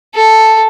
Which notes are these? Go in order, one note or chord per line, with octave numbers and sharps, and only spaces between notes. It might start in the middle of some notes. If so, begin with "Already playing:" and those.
A4